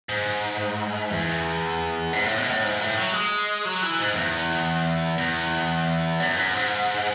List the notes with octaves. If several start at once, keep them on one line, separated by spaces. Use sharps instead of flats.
G#2
E2
G#2
A2
B2
A2
G#2
A2
F#3
G#3
F#3
E3
G#2
E2
E2
F#2
E2
F#2
G#2